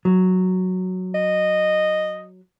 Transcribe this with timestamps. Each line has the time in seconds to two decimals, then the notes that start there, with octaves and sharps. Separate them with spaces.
0.05 F#3
1.15 D#5